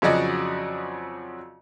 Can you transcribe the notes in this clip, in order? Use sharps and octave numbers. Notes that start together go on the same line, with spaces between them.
F2 C#3 F#3 F#4 D5 D#5